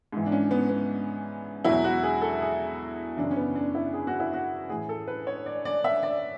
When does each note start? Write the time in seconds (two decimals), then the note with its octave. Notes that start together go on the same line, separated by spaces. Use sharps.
0.12 G#2 E3
0.26 D4
0.32 C#4
0.51 B3
0.70 B3
1.65 E2 B2 F#3 E4
1.84 F#4
2.03 G#4
2.21 A4
2.41 G#4
3.17 F#2 C#3 E3 D4
3.31 C#4
3.36 B3
3.56 D4
3.75 E4
3.93 G#4
4.07 F#4
4.20 E4
4.34 F#4
4.69 A2 E3 G#4
4.89 A4
5.07 B4
5.27 C#5
5.46 D5
5.65 D5
5.84 E5
6.03 D5